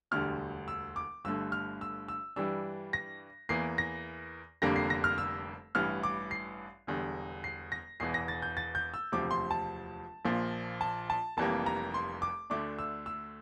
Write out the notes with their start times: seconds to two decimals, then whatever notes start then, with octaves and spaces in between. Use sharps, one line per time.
0.11 E1 D2 D3 G3 F6
0.68 E6
0.96 D6
1.25 G1 G2 D3 A3 E6
1.52 F6
1.81 E6
2.08 E6
2.36 G2 E3 G3 D4 E6
2.93 A#6
3.49 E2 E3 A#3 C7
3.78 A#6
4.62 F1 F2 D3 G3 A#3 A#6
4.76 C7
4.90 A#6
5.04 F6
5.18 E6
5.75 A1 G2 E3 G3 F6
6.03 D6
6.31 C7
6.87 E1 E2 D3 G3
7.44 C7
7.72 A#6
8.00 E1 E2 E3 C7
8.14 A#6
8.28 A6
8.42 G6
8.57 A6
8.75 G6
8.94 E6
9.12 E1 D2 C3 F3 D6
9.31 C6
9.51 A5
10.25 A#1 A#2 F3
10.81 A5
11.10 A5
11.37 F1 F2 E3 G3 A#3 A5
11.66 A#5
11.94 C6
12.22 D6
12.50 D2 D3 A3 D4 D6
12.79 E6
13.06 E6